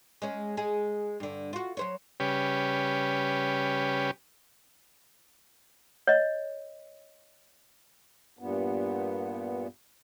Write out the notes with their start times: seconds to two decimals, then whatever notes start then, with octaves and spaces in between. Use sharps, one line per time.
0.22 G#3 C#4
0.57 G#3 G#4
1.20 G2 D3
1.53 F4 F#4
1.77 F#3 C5 C#5
2.20 C#3 G3 C#4 G4 B4
6.07 C#5 D#5
8.39 G2 A#2 B3